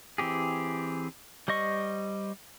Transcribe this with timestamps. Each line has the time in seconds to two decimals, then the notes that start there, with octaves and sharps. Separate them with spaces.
0.18 E3 C4 G4 G#4
1.48 G3 C5 D#5 C#6